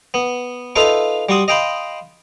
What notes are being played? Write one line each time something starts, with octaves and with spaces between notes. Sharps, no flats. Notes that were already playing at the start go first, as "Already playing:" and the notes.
B3
D#4 F4 A4 B4 E5 F5
G3 F#4 C6 D#6
D#5 F5 G5 A5 B5 C6